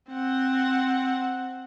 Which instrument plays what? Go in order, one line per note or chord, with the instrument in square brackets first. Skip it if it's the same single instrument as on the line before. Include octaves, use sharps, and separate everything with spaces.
[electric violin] C4 F#5